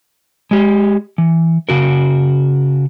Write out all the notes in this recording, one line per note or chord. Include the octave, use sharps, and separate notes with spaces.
G#3 G4
E3
C#3 F#4 A#4